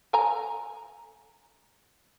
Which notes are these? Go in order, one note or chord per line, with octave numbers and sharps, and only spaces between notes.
A4 G#5 A#5